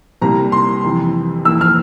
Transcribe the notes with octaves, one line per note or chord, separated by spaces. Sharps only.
C2 C3 G3 A#3 A#5
C6
F2 C3 E3
F2 E3 A#3 E6
F6